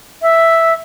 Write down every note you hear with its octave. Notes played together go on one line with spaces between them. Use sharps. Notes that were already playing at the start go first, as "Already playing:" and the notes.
E5